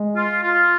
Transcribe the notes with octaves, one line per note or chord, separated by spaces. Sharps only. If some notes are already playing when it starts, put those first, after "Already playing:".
Already playing: G#3
F4
F4